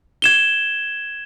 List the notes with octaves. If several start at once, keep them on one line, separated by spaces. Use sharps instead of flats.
G#6 E7 G7